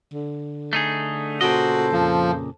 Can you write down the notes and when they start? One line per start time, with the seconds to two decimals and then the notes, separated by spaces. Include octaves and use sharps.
0.13 D3
0.73 A3 D#4 G#4
1.41 A#2 C#3 F#4 A4 C5 D#5
1.93 F2 F3